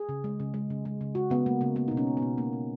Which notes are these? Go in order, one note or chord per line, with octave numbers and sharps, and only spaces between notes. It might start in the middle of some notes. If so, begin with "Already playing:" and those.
Already playing: G#4
C#3
G#3
C#3
G#3
C#3
G#3
C#3
G#3 F#4
C#3 B3
G#3 A#3
C#3 A#3
A#3 B3
B2 D#4
C#4
A#3
B3
B2
A#3
B2